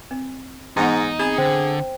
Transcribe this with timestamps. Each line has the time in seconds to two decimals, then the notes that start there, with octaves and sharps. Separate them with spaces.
0.11 C4
0.77 G#2 E3 B3 D#4 F#5
1.19 C4 G#4 G#5 B5
1.38 D3 C5 G5